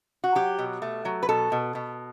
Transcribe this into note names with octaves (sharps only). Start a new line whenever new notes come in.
F#4
F#3 G4
B2
A3
F#3
B4
B2 A4
B2
B2